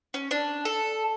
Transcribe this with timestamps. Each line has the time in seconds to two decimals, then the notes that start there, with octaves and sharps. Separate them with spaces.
0.14 C#4
0.31 D4
0.65 A4